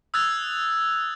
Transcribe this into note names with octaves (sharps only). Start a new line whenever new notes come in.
D#6 E6 F#6 G#6 A6 F7